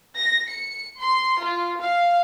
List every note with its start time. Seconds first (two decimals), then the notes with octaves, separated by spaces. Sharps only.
0.16 A#6
0.49 C#7
0.99 C6
1.42 F4
1.80 F5